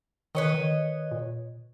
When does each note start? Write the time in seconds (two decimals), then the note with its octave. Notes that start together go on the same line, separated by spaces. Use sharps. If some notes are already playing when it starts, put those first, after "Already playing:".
0.35 D#3 B4 C#5 D#5
0.54 D#3
1.12 A#2